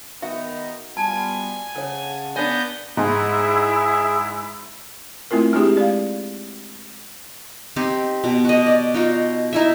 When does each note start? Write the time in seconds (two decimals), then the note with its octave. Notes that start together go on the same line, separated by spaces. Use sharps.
0.22 D#3 B3 D#4 F#4 E5
0.97 G3 B3 F4 G#5 A5
1.76 C#3 A4 C#5 F#5 A5
2.36 B3 D4 G#5 G6 A#6
2.97 G#2 E4 G#4
5.31 A3 C4 E4 F4 A#4
5.53 G#3 C4 D4 E4 G4 G#4
5.77 D5 F5
7.76 C4 D#4 G4
8.24 B2
8.45 F#4 D#5
8.66 D5
8.94 D#4 F4 F#4
9.53 D#4 E4 E5